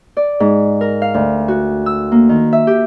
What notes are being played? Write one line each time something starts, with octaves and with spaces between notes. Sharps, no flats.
D5
G#2
A#4
F5
D2
F#4
E6
A#3
D#3
E5
G4